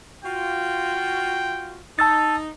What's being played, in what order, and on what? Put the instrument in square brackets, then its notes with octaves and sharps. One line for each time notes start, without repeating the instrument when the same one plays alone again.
[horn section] F4 F#4 [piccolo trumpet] G5
[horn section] D#4 [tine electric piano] A5 E6 A6